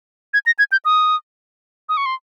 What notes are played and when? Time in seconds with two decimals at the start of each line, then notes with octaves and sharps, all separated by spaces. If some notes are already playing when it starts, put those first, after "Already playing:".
0.34 G#6
0.46 A#6
0.59 G#6
0.72 G6
0.85 D#6
1.89 D#6
1.97 C#6
2.06 C6